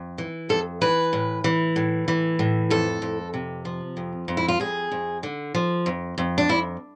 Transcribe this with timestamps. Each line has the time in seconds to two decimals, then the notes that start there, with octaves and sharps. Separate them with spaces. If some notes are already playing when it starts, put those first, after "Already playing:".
Already playing: F2
0.18 E3
0.49 F2 A4
0.81 E3 B4
1.13 A2
1.44 E3
1.76 A2
2.08 E3
2.39 A2
2.70 F2 A4
3.02 F2
3.34 C3
3.65 F3
3.97 F2
4.28 F2
4.37 E4
4.48 F4
4.60 F2 G#4
4.91 F2
5.23 D3
5.55 F3
5.86 F2
6.18 F2
6.38 D4
6.49 F2 E4